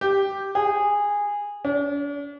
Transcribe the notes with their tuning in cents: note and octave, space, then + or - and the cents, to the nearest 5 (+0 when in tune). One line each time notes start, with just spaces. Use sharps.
G4 +0
G#4 -15
D4 -45